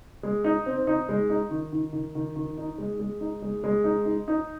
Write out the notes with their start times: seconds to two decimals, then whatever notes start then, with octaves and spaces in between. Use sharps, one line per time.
0.23 G#3
0.44 D#4
0.66 C4
0.87 D#4
1.09 G#3
1.30 D#4
1.51 D#3
1.73 D#3
1.93 D#3
2.15 D#3
2.36 D#3
2.57 D#4
2.78 G#3
3.00 G#3
3.20 D#4
3.42 G#3
3.64 G#3
3.84 D#4
4.05 D#4
4.28 D#4